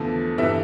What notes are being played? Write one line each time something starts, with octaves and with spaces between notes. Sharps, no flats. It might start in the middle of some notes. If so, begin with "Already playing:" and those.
Already playing: E2 D3 F3 A3
G2 E3 A3 E5